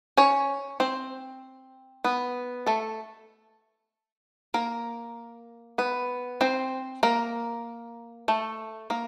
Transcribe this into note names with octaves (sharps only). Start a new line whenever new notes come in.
C#4 C#5
C4 C5
B3 B4
A3 A4
A#3 A#4
B3 B4
C4 C5
A#3 A#4
A3 A4
A#3 A#4